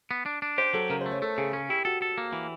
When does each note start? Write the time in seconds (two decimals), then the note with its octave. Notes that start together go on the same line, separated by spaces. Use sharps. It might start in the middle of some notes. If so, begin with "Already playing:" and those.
0.11 B3
0.26 D4
0.42 D4
0.58 G4 C5
0.73 F#3 A4
0.90 C#3 A#4
1.01 C5
1.06 A3
1.11 C#5
1.22 A3 A4
1.38 C#3 G#4
1.53 C#4 G#4
1.69 E4 G4
1.85 F#4 A4
2.02 A4
2.18 A#3
2.33 E3